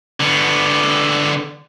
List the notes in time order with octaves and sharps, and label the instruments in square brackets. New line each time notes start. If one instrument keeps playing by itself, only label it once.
[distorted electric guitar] D3 B3